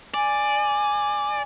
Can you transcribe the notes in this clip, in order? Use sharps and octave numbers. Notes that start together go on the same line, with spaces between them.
D5 G#5